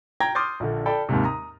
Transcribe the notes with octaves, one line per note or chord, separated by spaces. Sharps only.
G5 A#5 G#6 A#6
C6 D6 D#6 F6 G6 A6
A#1 D3
A4 D5 G5 B5
D#2 G#2 C3
A#5 D#6